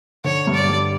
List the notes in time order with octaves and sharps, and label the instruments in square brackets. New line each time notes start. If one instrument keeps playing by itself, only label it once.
[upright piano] D3 [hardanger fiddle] C#5
[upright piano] G2
[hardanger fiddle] D5
[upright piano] G3